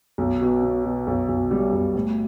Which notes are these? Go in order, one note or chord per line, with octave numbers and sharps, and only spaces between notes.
B1
B2
B2
B2
B1
B1
G3
B1
A2